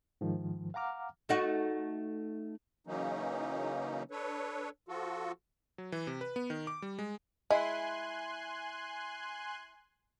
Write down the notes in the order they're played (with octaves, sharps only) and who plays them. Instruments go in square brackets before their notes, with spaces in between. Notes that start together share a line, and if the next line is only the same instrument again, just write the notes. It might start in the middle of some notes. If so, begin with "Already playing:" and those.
[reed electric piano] G#2 D#3 F3
F5 F#5 A#5 D6 F6
[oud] A3 D#4 F#4
[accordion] C#3 E3 F#3 A#3 C#4 D#4
D4 A4 B4 C#5
F3 F4 F#4 A4
[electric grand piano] F#3
E3
C3
B4
B3
D#3
D6
G3
G#3
[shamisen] G#3 [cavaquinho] E4 [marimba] D#5 [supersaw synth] G#5 C6 F#6